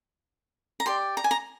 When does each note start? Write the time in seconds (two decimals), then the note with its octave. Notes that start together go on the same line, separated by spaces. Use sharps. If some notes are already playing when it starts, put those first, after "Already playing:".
0.80 A#5
0.86 G4 D5 C6
1.17 A#5
1.24 G#5
1.31 A#5